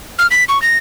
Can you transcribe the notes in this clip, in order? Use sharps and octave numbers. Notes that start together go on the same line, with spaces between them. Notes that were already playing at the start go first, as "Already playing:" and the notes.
F6
B6
C#6
A#6